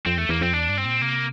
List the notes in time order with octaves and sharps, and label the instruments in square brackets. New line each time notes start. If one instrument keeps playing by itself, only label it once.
[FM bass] F2 [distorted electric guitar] C4
[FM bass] E2 [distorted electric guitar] A3
[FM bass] E2 [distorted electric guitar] A#3
[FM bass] F2 [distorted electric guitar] C4
[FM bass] E2 [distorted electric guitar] D4
[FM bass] G2
[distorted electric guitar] C4
[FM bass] A#2
[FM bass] C3 [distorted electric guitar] A#3